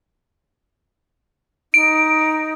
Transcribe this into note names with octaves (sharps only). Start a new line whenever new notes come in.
D#4 D7